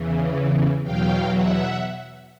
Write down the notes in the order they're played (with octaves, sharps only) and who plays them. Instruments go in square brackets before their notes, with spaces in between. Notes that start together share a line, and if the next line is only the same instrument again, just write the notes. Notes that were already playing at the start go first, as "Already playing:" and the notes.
Already playing: [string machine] E2 C#3 E3
E2 B2 F#3 F5 G5
E5 F#5